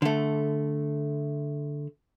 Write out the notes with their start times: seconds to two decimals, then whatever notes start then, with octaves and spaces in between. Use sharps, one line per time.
0.02 D3 A3